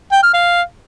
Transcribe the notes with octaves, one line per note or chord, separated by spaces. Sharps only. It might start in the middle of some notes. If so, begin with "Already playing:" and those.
G5
F6
F5